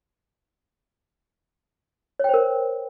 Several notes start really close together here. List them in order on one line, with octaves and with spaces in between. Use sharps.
C#5 G5 C5 A#4